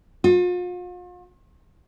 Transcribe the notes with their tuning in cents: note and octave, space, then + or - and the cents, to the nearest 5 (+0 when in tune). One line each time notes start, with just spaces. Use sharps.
F4 +40